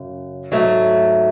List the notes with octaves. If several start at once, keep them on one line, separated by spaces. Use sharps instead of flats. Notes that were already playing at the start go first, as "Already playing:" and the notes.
Already playing: F#2 C#3
G#2 F#3 A3